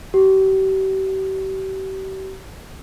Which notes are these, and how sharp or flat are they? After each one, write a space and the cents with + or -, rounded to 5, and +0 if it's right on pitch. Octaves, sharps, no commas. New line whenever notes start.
G4 -40